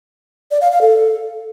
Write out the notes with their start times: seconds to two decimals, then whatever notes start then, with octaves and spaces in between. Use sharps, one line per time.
0.51 D5
0.61 F5
0.71 F5
0.81 A4